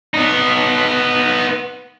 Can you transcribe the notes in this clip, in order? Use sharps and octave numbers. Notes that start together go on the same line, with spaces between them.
B3 D#4